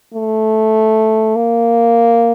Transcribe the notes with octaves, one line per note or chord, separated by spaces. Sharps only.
A3
A#3